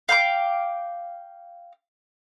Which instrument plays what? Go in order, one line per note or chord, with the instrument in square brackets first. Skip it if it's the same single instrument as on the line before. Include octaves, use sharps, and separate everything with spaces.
[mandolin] F5 G5 C6 D6